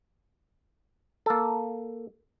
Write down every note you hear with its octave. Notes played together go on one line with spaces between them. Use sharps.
A#3 A4